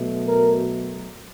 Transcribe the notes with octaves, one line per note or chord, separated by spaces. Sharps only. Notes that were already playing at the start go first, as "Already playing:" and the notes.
Already playing: B2 F#3 A3
A#4